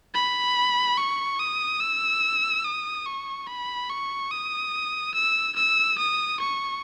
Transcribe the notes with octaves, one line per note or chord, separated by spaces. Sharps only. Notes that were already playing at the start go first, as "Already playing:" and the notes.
B5
C#6
D#6
E6
D#6
C#6
B5
C#6
D#6
E6
E6
D#6
C#6